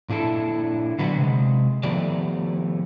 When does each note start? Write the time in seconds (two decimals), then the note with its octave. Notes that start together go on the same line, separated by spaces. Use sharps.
0.09 A#2 D4 E4 A4
0.99 D3 F#3 B3 D4 F#4
1.18 C3 G#3
1.83 D#3 F3 A3 B3 G4 D5